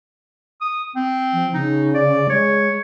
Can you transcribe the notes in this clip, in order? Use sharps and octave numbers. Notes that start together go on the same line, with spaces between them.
D#6
C4
F3
C#3 D#4
D5
G#3 C#5